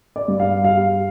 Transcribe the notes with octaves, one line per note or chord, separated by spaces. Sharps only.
D5
G2
F5
G3 F5